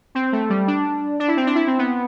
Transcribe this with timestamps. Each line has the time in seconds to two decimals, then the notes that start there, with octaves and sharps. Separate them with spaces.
0.15 C4
0.33 A3
0.49 G3
0.68 D4
1.20 D4
1.28 E4
1.37 C4
1.47 D4
1.55 E4
1.67 C4
1.78 B3